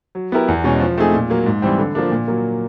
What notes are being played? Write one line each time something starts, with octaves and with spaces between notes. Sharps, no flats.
F#3
B3 E4 G4 A#4
E2
B2 G#3 C#4
F3
A3 C4 D#4 G#4
A#2
F#3 A#3
G#2
E3 G3 C4
D3
F3 A#3 D4
A#2
F#3 A#3